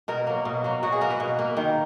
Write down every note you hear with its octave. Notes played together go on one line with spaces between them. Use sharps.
B2 A#4
F#3 A#3
B2
F#3 A#3
B2 F#4
G#4
A#3 A#4
B4
B2
A#3
D#3